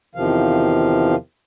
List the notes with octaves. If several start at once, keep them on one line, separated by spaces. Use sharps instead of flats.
E2 C3 D#3 F3 F5